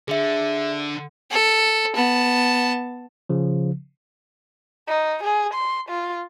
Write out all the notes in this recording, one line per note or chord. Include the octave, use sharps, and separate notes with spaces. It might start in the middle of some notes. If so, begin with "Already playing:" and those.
D3 G#4 E5
A4
B3 A5
C#3 F3
D#4
G#4
C6
F4